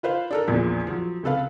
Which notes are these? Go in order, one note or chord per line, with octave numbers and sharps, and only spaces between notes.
F4 B4 C5 F5
D4 A4 A#4
A#1 E2 A#2 F3
F3 F#3
C#2 C3 A4 B4 F5